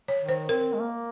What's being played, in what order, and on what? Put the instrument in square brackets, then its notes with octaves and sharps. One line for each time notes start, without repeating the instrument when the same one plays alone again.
[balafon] C#5
[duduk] D#3
[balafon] C5
[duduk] C4 [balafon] A#4
[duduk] G#3
A#3